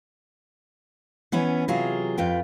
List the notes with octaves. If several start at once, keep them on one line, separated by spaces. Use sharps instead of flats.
E3 B3 C#4 B4
C3 F#3 F4 G#4
F2 F4 B4 G5